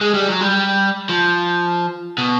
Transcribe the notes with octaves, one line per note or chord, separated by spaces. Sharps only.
G#3
G3
F#3
G3
F3
B2